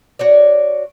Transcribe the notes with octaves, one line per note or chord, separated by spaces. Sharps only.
F#4 C#5 D5